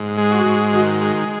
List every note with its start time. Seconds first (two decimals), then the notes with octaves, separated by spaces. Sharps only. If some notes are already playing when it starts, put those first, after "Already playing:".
Already playing: G#2
0.18 G#3
0.31 F#4
0.46 G#2
0.73 D#3 F#4
1.01 G#3